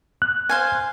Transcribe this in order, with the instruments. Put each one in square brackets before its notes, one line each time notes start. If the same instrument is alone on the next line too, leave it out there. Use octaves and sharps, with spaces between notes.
[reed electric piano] F#6
[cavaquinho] C5 F5 G#5